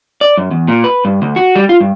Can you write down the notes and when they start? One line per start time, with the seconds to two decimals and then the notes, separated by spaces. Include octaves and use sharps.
0.21 D5
0.38 F#2
0.51 E2
0.68 A#2
0.84 B4
1.05 G2
1.22 D2
1.36 F#4
1.56 G3
1.69 F4
1.81 G2